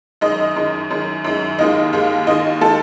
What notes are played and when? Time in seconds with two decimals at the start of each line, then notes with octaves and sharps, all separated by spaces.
0.21 F#2 D#3 G#3 D#5
0.56 F#2 D#3 G#3
0.90 F#2 D#3 G#3
1.24 F#2 D#3 G#3
1.59 D#2 D#3 G#3 D#5
1.93 D#2 D#3 G#3
2.27 D#2 D#3 G#3 D#5
2.61 D#3 G#3 A4